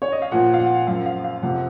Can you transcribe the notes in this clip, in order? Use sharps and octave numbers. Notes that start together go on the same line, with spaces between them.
C#5
D#5
F5
A#2 F3 F#5
F5
F#5
F#2 F3 F5
F5
F5
F2 C3 F3 F#5